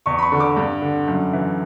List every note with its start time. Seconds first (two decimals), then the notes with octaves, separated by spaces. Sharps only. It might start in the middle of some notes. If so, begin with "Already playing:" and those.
0.06 E2 C#6
0.18 B5
0.23 C#6
0.32 D3
0.40 D6
0.57 G2
0.82 D3
1.08 F#2
1.33 E3